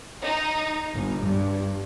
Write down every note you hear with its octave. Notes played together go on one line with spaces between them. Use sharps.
D#4
G1
G2